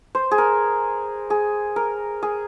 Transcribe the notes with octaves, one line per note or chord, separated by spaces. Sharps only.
C5
G#4
A#4
G#4
A#4
G#4